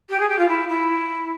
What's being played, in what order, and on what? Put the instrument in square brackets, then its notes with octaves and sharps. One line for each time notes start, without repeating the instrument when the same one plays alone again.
[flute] G4
G#4
G4
F4
E4
E4